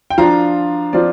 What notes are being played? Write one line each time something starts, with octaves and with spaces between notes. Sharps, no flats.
G5
F3 D4 F4 F5 A#5
F3 C4 F4 D5